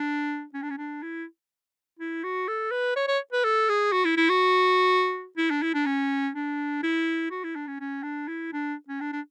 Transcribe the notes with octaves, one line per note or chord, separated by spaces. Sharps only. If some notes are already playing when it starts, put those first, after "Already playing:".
Already playing: D4
C#4
D4
C#4
D4
E4
E4
F#4
A4
B4
C#5
C#5
B4
A4
G#4
F#4
E4
E4
F#4
E4
D4
E4
D4
C#4
D4
E4
F#4
E4
D4
C#4
C#4
D4
E4
D4
C#4
D4
D4